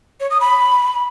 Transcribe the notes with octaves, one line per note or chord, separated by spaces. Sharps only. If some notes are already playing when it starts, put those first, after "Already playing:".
C#5
D#6
B5